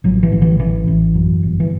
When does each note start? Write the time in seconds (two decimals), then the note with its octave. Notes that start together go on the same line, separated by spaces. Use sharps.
0.04 A1 F#3
0.23 E3
0.32 A1
0.42 E3
0.59 A1 E3
0.87 A1
1.15 F#2
1.43 G1
1.60 E3